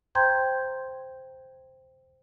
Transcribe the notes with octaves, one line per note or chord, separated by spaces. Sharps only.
C5 G5 A#5 C6 G6 G#6